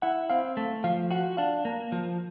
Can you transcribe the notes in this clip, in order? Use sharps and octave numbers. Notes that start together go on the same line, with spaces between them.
E4 F#5
C4 F5
A3
F3 F5
F#4 F#5
D4 F5
A#3
F3